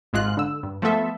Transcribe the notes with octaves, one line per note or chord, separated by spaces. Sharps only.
G#1 G#2 G#3 F4 F#6
D3 E6
G2
F3 A3 B3 A4 E5